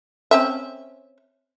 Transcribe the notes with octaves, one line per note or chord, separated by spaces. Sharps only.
C4 C#4 E5